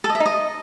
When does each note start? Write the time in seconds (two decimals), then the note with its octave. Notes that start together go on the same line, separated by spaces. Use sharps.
0.04 A4
0.10 D#5
0.15 E5
0.20 D#4
0.26 D#5